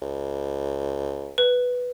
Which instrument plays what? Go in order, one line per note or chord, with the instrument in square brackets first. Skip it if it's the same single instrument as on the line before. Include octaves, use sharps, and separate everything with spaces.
[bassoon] C#2
[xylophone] B4